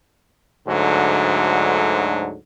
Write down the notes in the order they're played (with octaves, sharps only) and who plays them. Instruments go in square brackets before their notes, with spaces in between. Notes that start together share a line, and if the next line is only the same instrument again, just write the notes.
[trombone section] D2 G#2 D3 F#3